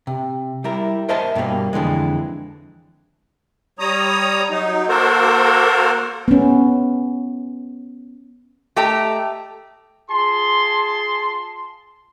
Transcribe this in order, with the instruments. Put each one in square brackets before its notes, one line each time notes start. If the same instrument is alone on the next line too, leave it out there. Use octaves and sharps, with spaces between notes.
[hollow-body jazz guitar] C3
G3 E4 A#4
A#4 C5 D#5 E5 A5
G2 B2 G3 G#3 A#3
F2 D3 E3 G#3
[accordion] G3 C#5 A#5 D#6
F#3 D#4
A#3 F#4 A4 A#4 C5
[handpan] B3 C#4
[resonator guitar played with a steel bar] A3 G4 D#5 G5 A5 A#5
[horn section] F4 G#4 A5 C6